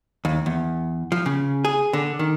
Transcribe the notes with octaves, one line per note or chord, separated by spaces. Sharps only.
D#2
E2
F3
C#3
G#4
D3
D#3